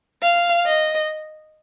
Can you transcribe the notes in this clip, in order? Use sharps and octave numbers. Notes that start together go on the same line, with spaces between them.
F5
D#5